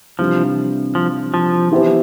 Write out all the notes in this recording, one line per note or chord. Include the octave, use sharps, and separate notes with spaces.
C3 E3 F3 G3 D4
F3
F3
E3 B3 E4 G4 C5